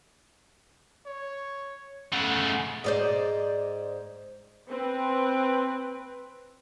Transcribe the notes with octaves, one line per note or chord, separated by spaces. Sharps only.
C#5
C#3 A3 F#5
G#2 C5 D5 D#5
C4 B4